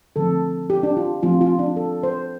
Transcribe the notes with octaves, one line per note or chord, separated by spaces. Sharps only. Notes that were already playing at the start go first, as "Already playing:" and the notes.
D3 F3 A3 C4 A4
G4
D4
F4
F3 A3 C4 F4
F4
D4
A4
C5